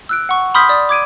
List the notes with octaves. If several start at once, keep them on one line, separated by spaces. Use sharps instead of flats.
E6 F#6 D7
F#5 C#6
B5 C6 D#6 F6 G6 B6
D5 D#6
D6 G#6 D7 D#7